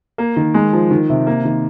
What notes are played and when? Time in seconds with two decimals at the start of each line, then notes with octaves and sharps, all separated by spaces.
0.18 A#3
0.36 D#3
0.54 G#3
0.73 F3
0.91 D#3
1.10 C3
1.27 A#3
1.45 D#3